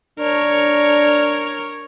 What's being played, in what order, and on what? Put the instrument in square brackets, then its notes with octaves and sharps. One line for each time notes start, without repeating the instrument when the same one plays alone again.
[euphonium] D4 [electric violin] A#4 C#5